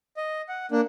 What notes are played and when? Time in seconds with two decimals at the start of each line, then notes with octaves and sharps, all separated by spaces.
0.17 D#5
0.49 F#5
0.71 A#3 D4